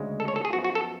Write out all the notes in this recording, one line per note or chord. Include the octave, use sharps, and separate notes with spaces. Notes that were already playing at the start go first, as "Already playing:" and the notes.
Already playing: D2 C#3 G#3
A4
C#5
A4
G#4
F#2 F3 B3 F#4
F#4
A4